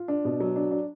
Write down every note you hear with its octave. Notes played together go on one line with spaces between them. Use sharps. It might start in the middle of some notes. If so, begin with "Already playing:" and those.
Already playing: F4
D4
B2
F#3
D4
D4